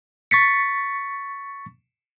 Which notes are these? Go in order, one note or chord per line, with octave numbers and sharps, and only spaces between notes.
C#6 A6 B6 C#7